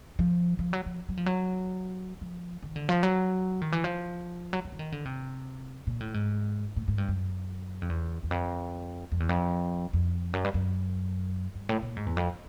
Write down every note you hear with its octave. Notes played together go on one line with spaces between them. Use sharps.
F3
F3
F#3
F3
F#3
F3
F#3
F3
D#3
D3
F3
F#3
D#3
E3
F3
F#3
F3
E3
D#3
D3
C3
A#2
A2
G#2
A2
G#2
G2
F#2
F2
E2
E2
F2
F2
E2
F2
F2
F#2
G2
F#2
G2
A2
A#2
G#2
E2
F2